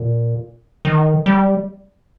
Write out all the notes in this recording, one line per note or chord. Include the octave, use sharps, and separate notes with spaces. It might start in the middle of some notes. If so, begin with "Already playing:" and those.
Already playing: A#2
D#3
G3